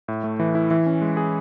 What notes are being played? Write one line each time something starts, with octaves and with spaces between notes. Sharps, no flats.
A2
A3
E3
E4
E3
C#4
G#3
G#4